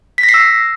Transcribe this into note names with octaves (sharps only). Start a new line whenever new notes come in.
B6
A#6
C7
E6